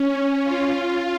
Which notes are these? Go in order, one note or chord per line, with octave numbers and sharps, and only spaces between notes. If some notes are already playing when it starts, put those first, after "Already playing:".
Already playing: C#4
F4